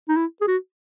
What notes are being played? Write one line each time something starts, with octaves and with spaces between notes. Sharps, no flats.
D#4
E4
G#4
F#4